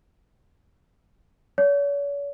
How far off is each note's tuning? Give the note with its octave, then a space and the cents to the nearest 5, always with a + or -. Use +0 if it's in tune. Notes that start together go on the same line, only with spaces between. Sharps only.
C#5 +40